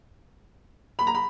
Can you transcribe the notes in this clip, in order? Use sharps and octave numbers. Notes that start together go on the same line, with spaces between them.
B5
A#5
B5